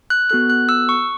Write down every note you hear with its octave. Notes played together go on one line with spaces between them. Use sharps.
F#6
B3 F#4 A4 F#6
F#6
E6
C#6